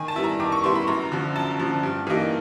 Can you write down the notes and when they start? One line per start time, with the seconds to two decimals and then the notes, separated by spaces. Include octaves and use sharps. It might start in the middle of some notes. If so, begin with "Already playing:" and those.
Already playing: D#3 G#5
0.08 A5
0.16 G3 B3 E4
0.24 A#5
0.40 D#3 D6
0.52 C#6
0.64 G3 B3 E4 C6
0.76 B5
0.87 F#2 A#5
1.12 D3 F3
1.35 F#2 A5
1.59 D3 F3
1.83 G2
2.07 E3 G3 A#3 D#4